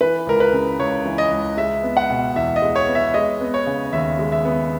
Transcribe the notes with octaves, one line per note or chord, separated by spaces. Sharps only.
E3 B4
C#2 A#4
B4
C#3
C#2 C#5
E3
D#5
C#2
G#3 E5
B3
F#5
B2
E2 E5
D#5
G#3
C#5
B3
E5
G#3 D#5
B3
C#5
C#3
D#2 E5
G#3
E5
B3